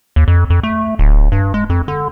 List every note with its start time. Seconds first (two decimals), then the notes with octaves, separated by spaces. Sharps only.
0.16 D#2
0.28 F2
0.50 F2
0.63 A3
0.99 D1
1.32 G2
1.54 G#3
1.70 F2
1.88 D3